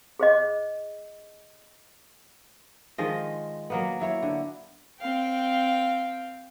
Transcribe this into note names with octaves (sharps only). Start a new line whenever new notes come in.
G#4 C5 D#5
D#3 F3 G#3 D#5
F#3 A#3 B3
F#3 E4 C#5
D3
C4 F5 G5